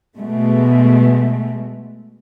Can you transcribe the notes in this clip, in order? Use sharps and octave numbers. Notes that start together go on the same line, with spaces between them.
B2 G#3 A3